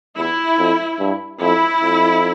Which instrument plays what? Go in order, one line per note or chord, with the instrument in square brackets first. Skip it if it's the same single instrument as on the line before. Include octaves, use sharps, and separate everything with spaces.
[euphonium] E2 [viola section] E4
[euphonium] F2
G2
[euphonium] F2 [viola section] E4
[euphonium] F2